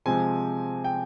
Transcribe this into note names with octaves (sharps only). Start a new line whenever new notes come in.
C3 F3 G#3 C4 G#5
G5